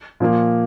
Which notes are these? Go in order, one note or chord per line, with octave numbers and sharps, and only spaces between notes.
A#2 F3 A#3